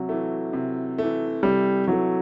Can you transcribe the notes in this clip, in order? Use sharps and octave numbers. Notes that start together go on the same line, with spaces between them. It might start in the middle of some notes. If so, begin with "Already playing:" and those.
Already playing: C3 F#3
E3 A3
C3
E3 A3
C3 G3
E3 F#3 A3